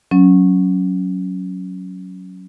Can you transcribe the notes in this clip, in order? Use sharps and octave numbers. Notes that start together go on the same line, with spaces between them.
F#3 C#4